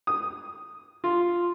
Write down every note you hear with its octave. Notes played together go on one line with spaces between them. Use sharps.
D#6
F4